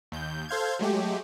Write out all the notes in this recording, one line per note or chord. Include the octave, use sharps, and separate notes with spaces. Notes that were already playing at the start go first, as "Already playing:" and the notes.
D#2 G6
A4 C5 F5 G6 G#6
F#3 G#3 A3 G4